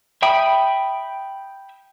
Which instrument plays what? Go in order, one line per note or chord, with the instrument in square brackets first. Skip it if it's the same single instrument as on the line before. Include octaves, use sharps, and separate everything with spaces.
[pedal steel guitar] E5 G5 B5 D#6